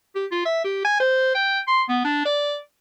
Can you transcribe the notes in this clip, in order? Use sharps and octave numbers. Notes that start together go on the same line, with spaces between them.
G4
F4
E5
G4
G#5
C5
G5
C6
B3
D4
D5